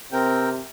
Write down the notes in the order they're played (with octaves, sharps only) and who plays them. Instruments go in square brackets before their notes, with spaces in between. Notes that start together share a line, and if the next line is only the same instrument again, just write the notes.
[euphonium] C3 [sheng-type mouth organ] C4 A#4 G5